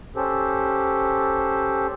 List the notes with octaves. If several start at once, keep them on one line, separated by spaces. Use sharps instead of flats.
C#4 G4 A4 C5